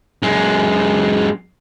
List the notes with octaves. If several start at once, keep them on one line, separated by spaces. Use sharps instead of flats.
F#2 G#3